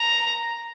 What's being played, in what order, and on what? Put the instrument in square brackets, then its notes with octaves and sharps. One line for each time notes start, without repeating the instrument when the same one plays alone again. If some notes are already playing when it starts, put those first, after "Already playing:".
Already playing: [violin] A#5